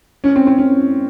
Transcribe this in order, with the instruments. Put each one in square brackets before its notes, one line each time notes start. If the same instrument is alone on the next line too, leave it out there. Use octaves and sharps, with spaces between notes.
[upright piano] C#4
C4
C4
C#4